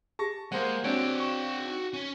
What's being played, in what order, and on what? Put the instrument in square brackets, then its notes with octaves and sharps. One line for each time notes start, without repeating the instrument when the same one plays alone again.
[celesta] G4 G#4 [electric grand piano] A5 C#6 A#6
[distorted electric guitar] G#3 [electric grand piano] A#3 C5 F#5
[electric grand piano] C4 D4 C#5 [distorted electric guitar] F#4 G5
[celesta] C#6 E7
D#4
[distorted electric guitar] C#4